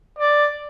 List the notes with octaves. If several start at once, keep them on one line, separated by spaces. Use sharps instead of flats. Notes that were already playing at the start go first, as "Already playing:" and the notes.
D5